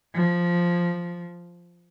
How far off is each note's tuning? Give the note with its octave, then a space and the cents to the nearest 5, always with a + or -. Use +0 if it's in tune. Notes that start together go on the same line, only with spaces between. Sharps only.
F3 -5